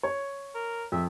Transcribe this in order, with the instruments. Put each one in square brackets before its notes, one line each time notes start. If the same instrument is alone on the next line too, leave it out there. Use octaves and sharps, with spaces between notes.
[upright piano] C#5
[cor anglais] A#4
[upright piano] F2 [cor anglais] E5